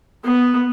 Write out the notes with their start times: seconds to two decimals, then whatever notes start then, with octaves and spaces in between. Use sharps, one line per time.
0.24 B3